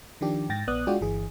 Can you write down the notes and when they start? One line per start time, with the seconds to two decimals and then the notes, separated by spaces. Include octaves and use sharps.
0.21 D#3 F3 D4 G4
0.49 G#2 G5 A6 A#6
0.68 A#1 B3 D5 D#6 F#6
0.87 G#3 D4 F4 F#4 D5 G5
1.01 G1 E3 G#4